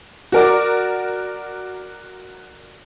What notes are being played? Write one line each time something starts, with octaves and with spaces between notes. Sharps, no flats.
F#4 A#4 D5